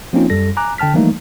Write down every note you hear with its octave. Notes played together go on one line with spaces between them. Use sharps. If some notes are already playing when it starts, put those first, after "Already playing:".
F3 A#3 C4 C#4 D#4 F4
F#2 G3 A4 A#6
G#5 A#5 D6 F#6
D3 G5 A5 F6 B6
E3 F3 G3 A3 A#3 D#4